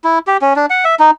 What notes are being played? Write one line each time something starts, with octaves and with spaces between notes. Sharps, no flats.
E4
G4
C#4
D4
F#5
E5
D#4